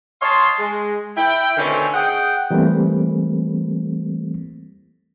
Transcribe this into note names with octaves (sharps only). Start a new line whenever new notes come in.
C#5 D#5 F5 A5 C6
G#3
E4 G5
B2 D3 D#3 A3 C4 C#4
G#4 D#5 F#5 G5
E3 G3 A3 A#3 C4